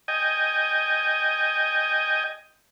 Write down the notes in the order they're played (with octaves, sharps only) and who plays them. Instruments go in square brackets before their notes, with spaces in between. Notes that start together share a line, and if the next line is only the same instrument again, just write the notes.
[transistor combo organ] D#5 G5 G#5